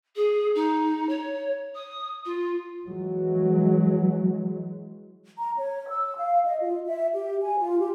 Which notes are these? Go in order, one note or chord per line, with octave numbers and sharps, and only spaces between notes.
G#4
D#4
C#5
D#6
F4
E3 F#3 G#3
A#5
C#5
E6
F5
D#5
F4
E5
G4
G#5
F4
G4